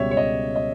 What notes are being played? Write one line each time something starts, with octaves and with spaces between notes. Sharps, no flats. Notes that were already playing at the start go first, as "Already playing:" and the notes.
Already playing: C#2 B2 G3 C#5 E5
C#5
D#5
D#5